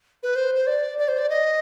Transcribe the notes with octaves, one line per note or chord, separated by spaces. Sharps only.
B4
C5
C5
D5
D5
C5
D5
D#5